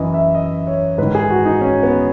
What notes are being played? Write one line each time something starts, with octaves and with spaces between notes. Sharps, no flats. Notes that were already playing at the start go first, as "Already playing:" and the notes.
Already playing: F#2 E3 D#5
E5
D#5
C#5
G#2 D#3 B4
G#4
F#4
D#4
C#4
B3